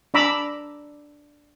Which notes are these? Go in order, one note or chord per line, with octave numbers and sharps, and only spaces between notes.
D4 D5 A#5 B5 D6 E6